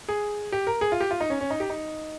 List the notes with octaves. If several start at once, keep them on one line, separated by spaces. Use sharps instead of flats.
G#4
G4
A#4
G#4
F4
G4
F4
D#4
C#4
C#4
D#4
G4
D#4